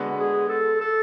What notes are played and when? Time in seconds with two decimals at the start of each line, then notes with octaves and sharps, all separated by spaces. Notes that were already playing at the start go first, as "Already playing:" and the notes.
Already playing: D3 G#3 B3 F#4 B4
0.20 G#4
0.49 A4
0.81 A4